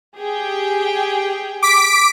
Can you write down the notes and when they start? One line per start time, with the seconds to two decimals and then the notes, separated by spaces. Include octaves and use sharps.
0.17 G4 G#4 G5
1.63 D6 B6 D7